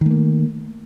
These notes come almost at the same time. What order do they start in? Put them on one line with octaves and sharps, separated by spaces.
D#3 A3 A#3